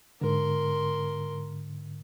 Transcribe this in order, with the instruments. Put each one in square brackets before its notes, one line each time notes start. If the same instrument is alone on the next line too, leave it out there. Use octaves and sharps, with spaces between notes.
[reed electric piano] G#2 D3 [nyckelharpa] A#4 C6